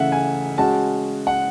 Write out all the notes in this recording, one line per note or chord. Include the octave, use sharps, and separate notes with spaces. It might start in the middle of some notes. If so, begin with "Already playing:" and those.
Already playing: C#3 E3 A3 C#4 E5 F#5
G#5
G#3 C#4 F#4 A5
F#5